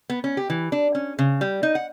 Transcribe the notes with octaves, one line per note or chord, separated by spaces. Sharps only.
B3
C#4
G4
E3
D4
C#4
C#3
G3
D#4
F#5